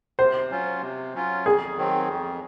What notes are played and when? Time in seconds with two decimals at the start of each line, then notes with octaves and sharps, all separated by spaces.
0.19 C3 C5
0.50 F#3 C#4 F4
0.82 C3
1.14 F#3 C#4 F4
1.45 F2 G#4
1.77 D#3 F#3 C4
2.08 F2